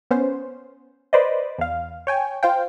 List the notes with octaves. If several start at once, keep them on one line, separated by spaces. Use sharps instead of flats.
B3 C#4 C5
B4 C5 D5 D#5
E2 F5
C#5 G5 G#5
F4 C5 F5 G5